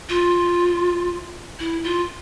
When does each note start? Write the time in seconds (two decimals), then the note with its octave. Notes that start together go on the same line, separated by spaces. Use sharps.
0.09 F4
1.60 E4
1.84 F4